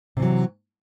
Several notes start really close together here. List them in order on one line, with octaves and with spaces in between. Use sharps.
C3 E3 F#3